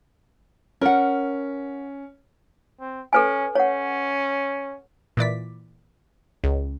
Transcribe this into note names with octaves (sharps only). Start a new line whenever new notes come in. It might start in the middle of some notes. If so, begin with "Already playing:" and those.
C#4 A#4 F#5
C4
C#4 A4 B4 G#5
C#4 C#5 F#5
A#2 E3 D5 B6
C#2